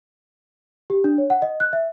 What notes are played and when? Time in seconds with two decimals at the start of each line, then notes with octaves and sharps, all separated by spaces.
0.90 G4
1.04 D4
1.18 C#5
1.30 F#5
1.42 D#5
1.60 F#6
1.73 E5